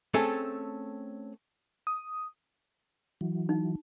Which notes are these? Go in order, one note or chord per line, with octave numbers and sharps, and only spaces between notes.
A3 C4 C#4 G#4 A4
D#6
E3 F#3
D#4